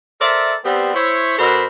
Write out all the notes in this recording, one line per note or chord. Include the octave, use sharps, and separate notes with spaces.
A4 A#4 C5 D5 E5
G3 B3 C4
E4 C5 C#5
B2 F#4 A4 A#4 C5 B5